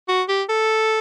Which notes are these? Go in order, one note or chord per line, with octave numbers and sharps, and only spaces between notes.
F#4
G4
A4